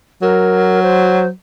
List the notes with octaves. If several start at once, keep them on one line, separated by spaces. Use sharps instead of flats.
F#3 A#4
C5